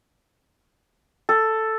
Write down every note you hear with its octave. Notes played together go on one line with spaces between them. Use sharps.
A4